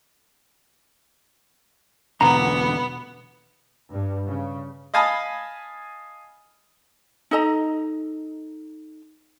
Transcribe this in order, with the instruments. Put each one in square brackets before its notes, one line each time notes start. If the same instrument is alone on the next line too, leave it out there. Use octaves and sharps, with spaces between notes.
[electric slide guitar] E2 B2 D3 [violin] B3 [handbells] A#5
[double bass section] G2
C#3
[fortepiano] D#5 F5 G#5 A5 B5 D#6
[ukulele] D#4 A4 D#5 A#5